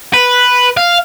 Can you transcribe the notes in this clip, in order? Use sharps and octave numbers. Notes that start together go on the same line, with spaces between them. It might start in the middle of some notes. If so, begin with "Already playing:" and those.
B4
F5